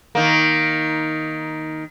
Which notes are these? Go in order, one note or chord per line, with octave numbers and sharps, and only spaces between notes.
D#3 A#3